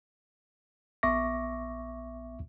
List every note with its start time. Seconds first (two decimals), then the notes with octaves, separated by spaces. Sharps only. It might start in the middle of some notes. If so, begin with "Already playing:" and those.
1.03 A#1 B3 E5 C#6 D6 A#6